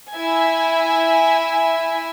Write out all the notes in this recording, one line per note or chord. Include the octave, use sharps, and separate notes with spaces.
E4 E5 G#5